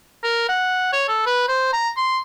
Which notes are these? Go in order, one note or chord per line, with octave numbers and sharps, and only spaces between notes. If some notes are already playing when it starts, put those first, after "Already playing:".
A#4
F#5
C#5
A4
B4
C5
A#5
C6